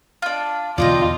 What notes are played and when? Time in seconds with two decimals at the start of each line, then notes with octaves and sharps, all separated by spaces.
0.22 D4 F4
0.78 E2 B2 D3 F4 D5 D#5 G5